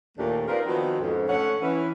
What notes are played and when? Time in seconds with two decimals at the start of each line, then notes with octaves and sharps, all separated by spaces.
0.17 D#2 A#2 A3 A#3 D4 G4
0.48 C4 D#4 F4 A#4 B4 D5
0.66 D#3 F3 B3 C4 D#4 F#4
1.01 F2 G#2 C#4
1.28 D3 A3 C#4 C#5 F#5
1.61 E3 C#4